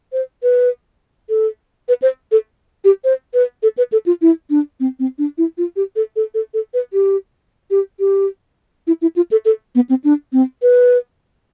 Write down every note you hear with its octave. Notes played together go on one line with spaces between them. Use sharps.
C5
B4
A4
B4
C5
A4
G4
C5
B4
A4
B4
A4
F4
E4
D4
C4
C4
D4
E4
F4
G4
A4
A4
A4
A4
B4
G4
G4
G4
E4
E4
F4
A4
A4
B3
C4
D4
C4
B4